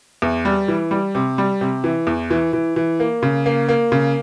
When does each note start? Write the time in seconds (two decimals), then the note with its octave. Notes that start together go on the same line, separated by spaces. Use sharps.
0.22 E2
0.45 G3
0.68 E3
0.91 G3
1.15 C3
1.38 G3
1.61 C3
1.84 E3
2.07 E2
2.30 E3
2.53 E3
2.76 E3
3.00 A#3
3.23 C#3
3.46 A#3
3.69 A#3
3.92 C#3